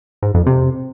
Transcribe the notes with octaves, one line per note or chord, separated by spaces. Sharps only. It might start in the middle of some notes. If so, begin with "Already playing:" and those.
G#2
F2
C3